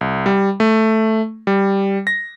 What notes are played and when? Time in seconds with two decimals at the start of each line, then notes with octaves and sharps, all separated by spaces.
0.01 C2
0.26 G3
0.60 A3
1.47 G3
2.07 A#6